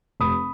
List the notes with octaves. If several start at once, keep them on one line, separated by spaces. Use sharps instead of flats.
F1 B5 D#6